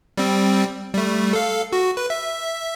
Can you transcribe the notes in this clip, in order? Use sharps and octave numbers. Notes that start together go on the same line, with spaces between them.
G3 C4
G3 A3
A4 F5
F#4
B4
E5